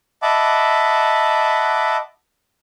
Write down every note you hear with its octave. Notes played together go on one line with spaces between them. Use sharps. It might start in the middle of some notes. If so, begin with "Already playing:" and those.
D#5 E5 F#5 A5 B5 D6